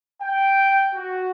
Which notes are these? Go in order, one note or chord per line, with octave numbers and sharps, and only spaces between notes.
G5
F#4